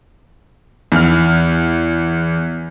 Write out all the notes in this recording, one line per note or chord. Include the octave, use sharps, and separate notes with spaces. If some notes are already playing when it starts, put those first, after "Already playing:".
E2 F6